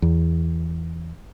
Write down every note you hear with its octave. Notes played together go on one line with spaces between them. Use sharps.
E2